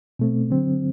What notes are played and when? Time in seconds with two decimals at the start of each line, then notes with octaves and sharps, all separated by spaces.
0.19 B2 A3 C4
0.50 D3 F#3 C4